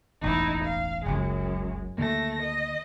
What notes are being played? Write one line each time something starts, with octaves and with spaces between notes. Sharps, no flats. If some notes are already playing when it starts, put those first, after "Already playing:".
E1 A1 D#2 D#4 E4
F5
F#1 C#2 F#2 G#3
D2 D#3 A3 A#3 A#6
D#5